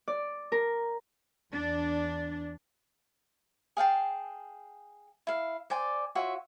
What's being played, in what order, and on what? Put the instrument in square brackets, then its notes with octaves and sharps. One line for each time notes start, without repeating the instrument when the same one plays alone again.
[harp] D5
A#4
[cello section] E2 D4
[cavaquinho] G#4 F5 G5 A5
E4 F5
C5 D5 G#5
F4 F#4 C#5 E5